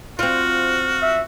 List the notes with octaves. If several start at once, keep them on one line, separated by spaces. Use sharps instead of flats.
C4 F4 F#4 F6
E5